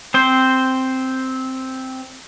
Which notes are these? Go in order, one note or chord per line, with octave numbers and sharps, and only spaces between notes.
C4 C5